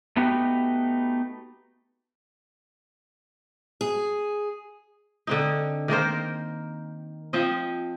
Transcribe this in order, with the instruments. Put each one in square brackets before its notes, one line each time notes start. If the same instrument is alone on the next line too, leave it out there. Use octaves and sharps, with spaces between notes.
[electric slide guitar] A3 B3 D#4 F#4 G4
[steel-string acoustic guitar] G#4
[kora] D3 C4 D#4
D#3 A#3 A#4 C5
F3 C4 D#5